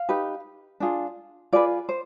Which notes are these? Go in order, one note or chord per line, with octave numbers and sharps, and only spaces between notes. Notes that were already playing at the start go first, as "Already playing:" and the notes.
Already playing: F5
D#4 G4 B4
D4 F4 G#4
F4 G#4 B4 D5
C5